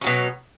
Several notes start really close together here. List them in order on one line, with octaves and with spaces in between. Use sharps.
C#4 F#3 B2